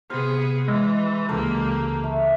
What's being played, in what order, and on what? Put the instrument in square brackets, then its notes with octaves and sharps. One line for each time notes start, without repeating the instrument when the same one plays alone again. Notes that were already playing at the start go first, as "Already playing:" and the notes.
[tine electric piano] C3 G4 F6 [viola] B3 G#4 [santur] C5
[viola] E3 [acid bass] G#3 [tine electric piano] E6
[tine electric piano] C#2 C#3 E3 [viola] A#3 G4 [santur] A4 A#4
[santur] A3